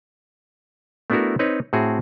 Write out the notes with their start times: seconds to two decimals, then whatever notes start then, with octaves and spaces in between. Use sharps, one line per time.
1.10 A3 B3 D4 E4 F#4 A#4
1.39 C4 D#4 B4 C#5
1.73 A2 C4 F#4 G#4